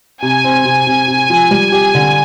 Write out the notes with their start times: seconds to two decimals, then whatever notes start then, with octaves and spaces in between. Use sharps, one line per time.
0.22 C3 G#5
0.44 C4
0.65 C3
0.87 C3
1.08 C3
1.30 F3
1.51 G3
1.72 G4
1.95 D3